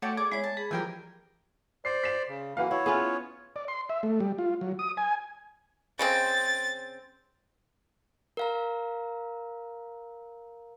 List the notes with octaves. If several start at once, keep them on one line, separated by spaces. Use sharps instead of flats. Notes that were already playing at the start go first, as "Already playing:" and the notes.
A3 F#4 C#5 D5 G5 A5
G#4 D5 D6 G#6
G#3 E4 C#5
A5
G#4 B5
E3 F3 G3 A#4 G5 G#5
C5 D5 C7
B6 E7
C#3
E3 A#3 F#4 B4 F5
E4 C#5
B3 C#4 E4 F4 G#4
D5
C6
E5
A3
G3
F4
F#3
D#6
G#5
C#3 G#3 C4 A6
A#4 F5 A#5